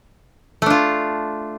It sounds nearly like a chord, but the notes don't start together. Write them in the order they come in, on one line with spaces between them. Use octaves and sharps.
A3 D4 F4